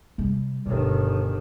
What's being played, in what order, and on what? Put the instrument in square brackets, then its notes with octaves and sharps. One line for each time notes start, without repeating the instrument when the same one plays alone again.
[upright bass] C3 G3
[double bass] G1 D#3 [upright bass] B2